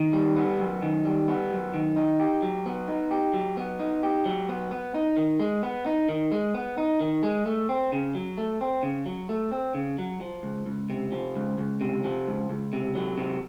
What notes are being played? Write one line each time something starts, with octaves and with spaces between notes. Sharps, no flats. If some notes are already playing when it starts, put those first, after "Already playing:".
Already playing: D#3
G3
B3
F#2
D#3
G3
B3
F#2
D#3
D#4
G4
F#3
B3
D#4
G4
F#3
B3
D#4
G4
F#3
B3
B3
D#4
D#3
G#3
B3
D#4
D#3
G#3
B3
D#4
D#3
G#3
A3
C4
C#3
F#3
A3
C4
C#3
F#3
A3
C4
C#3
F#3
F3
C#2
C#2
C3
F3
C#2
C#2
C3
F3
C#2
C#2
C3
F#3
C3